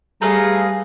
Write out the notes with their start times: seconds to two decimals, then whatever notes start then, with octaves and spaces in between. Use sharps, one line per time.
0.22 G3 A3 G#4 B4 F5 A#5